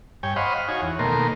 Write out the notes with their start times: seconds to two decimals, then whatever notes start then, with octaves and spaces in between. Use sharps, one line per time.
0.23 G2 C#5 G5 G#5
0.36 C5 D#5 F5 F#5 B5 C#6
0.57 F6
0.68 D#4 F#4 C#5 G#5
0.82 E2
0.99 B2 D#3 A3 A#3 A#4 C6